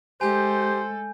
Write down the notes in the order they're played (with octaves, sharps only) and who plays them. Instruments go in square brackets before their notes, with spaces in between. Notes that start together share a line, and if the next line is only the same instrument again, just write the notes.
[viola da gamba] G#3 A4 [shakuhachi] G4 [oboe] C5 [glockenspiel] G#5 G6